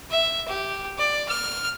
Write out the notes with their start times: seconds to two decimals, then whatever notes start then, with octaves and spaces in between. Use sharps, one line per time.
0.10 E5
0.48 G4
0.98 D5
1.28 F6